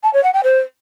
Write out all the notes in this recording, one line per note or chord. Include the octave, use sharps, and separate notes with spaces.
A5
C#5
F#5
G5
C5